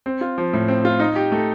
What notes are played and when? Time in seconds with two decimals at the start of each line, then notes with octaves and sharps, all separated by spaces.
0.06 C4
0.21 F4
0.38 F3
0.53 A2
0.68 C4
0.85 F4
1.00 D#4
1.16 G4
1.32 A3